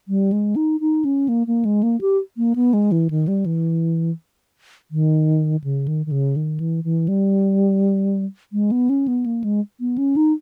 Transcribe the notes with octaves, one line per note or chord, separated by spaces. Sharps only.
G3
G#3
D#4
D#4
C#4
A#3
A#3
G#3
A#3
G4
A#3
B3
G#3
E3
D#3
G3
E3
D#3
C#3
D#3
D#3
C#3
D#3
E3
E3
G3
G#3
B3
C#4
B3
A#3
G#3
B3
C#4
D#4